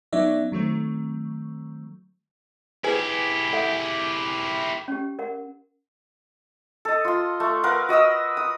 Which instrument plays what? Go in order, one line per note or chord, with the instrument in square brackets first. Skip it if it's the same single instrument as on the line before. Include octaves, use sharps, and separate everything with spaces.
[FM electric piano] F#3 B3 C#4 D#4 D5 E5
D#3 F#3 A3 C4
[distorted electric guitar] E4 G4 [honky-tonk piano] G#4 [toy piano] B4
[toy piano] A4 E5 F#5
C#4 G4
A#4 F#5
[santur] A4 D#5
F4 C6
A3
A#4 B4 F5 F#5
F#4 D#5 D#6 E6
D#6